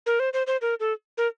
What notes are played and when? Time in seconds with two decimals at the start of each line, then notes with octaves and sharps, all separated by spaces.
0.06 A#4
0.20 C5
0.33 C5
0.47 C5
0.62 A#4
0.80 A4
1.18 A#4